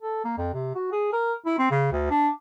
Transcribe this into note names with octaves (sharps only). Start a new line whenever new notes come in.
A4
A#3
F2
C3
F#4
G#4
A#4
E4
C4
C#3
D2
D4